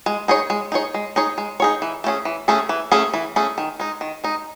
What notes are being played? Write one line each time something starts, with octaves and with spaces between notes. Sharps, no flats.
G#3
D#4 G#4 C#5
G#3
D#4 G#4 C#5
G#3
D#4 G#4 C#5
G#3
D#4 G#4 C#5
E3
A3 C#4 G#4
E3
A3 C#4 G#4
E3
A3 C#4 G#4
E3
A3 C#4 G#4
D#3
G#3 D#4
D#3
G#3 D#4